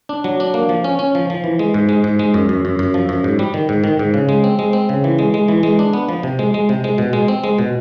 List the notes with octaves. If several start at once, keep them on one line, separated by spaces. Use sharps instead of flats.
D4
F#3
D4
A#3
F3
C#4
C#4
F3
F3
E3
G#3
G#2
G#3
G#2
G#3
F#2
F#2
F#2
F#2
F3
F#2
G#2
G3
D#3
G#2
D#3
G#2
C#3
G#3
C4
G#3
C4
C#3
E3
G#3
G#3
E3
G#3
D4
B3
F3
C3
G#3
G#3
C3
G#3
B2
G#3
C4
G#3
B2